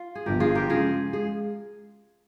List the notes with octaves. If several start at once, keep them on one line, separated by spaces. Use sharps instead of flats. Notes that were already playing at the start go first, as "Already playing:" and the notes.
Already playing: F4
G#4
G1 G2 F3 G4 A#4
F4 G#4
G4 A#4
C#3 F3 G#3 F4 G#4
G#3 G#4